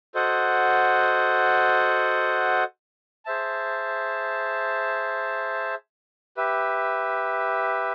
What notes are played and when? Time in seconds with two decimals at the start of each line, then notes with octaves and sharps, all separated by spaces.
0.15 F#4 A4 C5 D#5 F#5
3.25 G#4 C5 E5 A5
6.37 G4 B4 E5